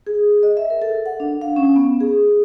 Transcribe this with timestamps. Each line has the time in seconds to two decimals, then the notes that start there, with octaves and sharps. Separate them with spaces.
0.07 G#4
0.43 D#5
0.57 E5
0.70 A#4
0.82 A4
1.06 F#5
1.20 D4
1.41 F5
1.56 C#4
1.76 B3
2.01 G#4